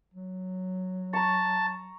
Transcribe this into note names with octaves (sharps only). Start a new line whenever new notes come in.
F#3
A5 A#5 C#6